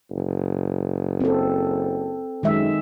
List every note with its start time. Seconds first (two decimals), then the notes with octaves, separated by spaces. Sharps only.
0.11 F#1
1.21 C4 A4
2.43 F#2 D#3 G#3 E5